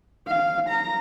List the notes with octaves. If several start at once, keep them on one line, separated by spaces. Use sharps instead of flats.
F5
A#5